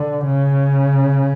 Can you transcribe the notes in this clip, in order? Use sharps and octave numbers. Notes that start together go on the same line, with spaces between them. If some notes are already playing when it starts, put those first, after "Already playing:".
Already playing: D3
C#3